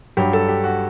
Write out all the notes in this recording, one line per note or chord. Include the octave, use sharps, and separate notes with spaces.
G2 F#3 G4
A4
G4
F#4